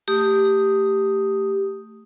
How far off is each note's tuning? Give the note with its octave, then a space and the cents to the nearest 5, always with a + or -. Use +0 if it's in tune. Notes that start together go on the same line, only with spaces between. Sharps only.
A3 +15 G4 +0 D#6 +0